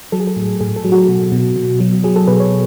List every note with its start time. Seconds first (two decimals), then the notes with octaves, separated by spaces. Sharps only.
0.12 F#3 A4
0.20 G#4
0.27 A4
0.36 A2
0.60 A2 G#4
0.76 A4
0.84 F#3
0.92 F#4
1.08 B2
1.32 B2
1.56 B2
1.80 F#3
2.04 F#3 G#4
2.16 A4
2.27 B2 B4
2.40 C#5